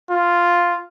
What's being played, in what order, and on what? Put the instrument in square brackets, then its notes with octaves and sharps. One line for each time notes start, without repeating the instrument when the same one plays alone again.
[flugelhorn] F4